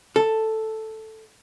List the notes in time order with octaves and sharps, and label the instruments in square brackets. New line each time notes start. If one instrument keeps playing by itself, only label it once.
[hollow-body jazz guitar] A4